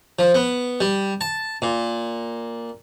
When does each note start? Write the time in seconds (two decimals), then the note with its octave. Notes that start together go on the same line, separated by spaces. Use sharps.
0.19 F3
0.34 B3
0.81 G3
1.21 A5
1.62 A#2